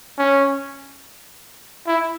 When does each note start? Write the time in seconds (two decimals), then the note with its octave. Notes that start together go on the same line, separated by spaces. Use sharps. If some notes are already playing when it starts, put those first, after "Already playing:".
0.18 C#4
1.87 E4